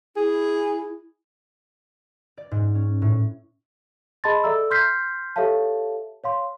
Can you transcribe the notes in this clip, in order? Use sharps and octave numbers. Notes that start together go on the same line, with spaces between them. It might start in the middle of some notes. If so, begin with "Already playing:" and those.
E4 G#4
D5
G#2
C#4
A2
G#4 D#5 A5 B5 C6 A6
A4 D5 E5 A#5 E6
C6 F6 G6 B6 C7
G4 A4 C#5 E5 F5 A5
C#5 F5 C6